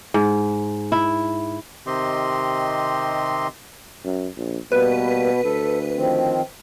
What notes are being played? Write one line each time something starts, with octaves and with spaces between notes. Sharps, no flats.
G#2
E4
C3 D#3 C4 G4 D#5 C6
F#2
A#1
B2 G3 A#3 B4
D2 A4
D#3 F3 C4